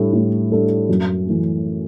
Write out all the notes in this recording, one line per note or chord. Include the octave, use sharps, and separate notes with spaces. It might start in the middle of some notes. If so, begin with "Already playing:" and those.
Already playing: A2 G3 D4 A4
A2
G3 D4 A4
F#2
E3 A3